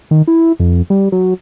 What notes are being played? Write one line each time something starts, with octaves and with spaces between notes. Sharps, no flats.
D#3
E4
F2
G3
F#3